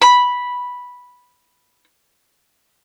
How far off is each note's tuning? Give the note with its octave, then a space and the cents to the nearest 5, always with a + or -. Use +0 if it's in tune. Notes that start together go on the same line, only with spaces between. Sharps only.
B5 -5